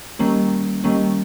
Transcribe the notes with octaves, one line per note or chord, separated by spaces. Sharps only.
D#3 G3 A#3 C#4
D#3 G3 A#3 C#4